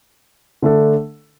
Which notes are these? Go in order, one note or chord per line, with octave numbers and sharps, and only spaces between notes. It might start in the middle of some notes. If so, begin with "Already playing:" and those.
D3 A3 D4 A4